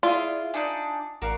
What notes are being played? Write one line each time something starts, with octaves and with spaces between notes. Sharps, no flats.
E4 F4 G#4 D5 F5
D4 D#4 D5 G#5 A5
A1 F#4 A#4 D5 F5 C7